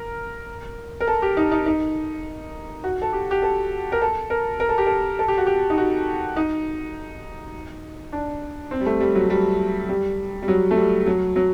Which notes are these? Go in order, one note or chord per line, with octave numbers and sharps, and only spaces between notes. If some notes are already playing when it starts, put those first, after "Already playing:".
Already playing: A#4
A#4
A4
G4
D#4
D#4
D#4
F#4
A4
G4
G4
A4
A#4
A4
A#4
A#4
A4
G4
A4
A4
G4
F#4
G4
D#4
F#4
D#4
D4
C4
G3
A3
G3
F#3
G3
G3
G3
F#3
A3
G3
F#3
F#3